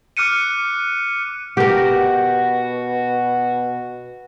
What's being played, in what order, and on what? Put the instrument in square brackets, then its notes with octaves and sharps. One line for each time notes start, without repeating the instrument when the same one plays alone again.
[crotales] D6 F6 F#6 C#7 D#7
[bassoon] B2 [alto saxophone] F#4 [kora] G4 A#4